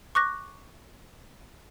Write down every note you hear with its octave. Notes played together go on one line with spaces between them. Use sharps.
C#6 D6 F#6 A#6